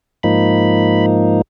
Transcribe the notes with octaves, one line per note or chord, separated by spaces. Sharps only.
G#2 F3 A#3 D#4 B5